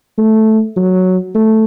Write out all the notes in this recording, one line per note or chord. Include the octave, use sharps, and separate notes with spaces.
A3
F#3
A3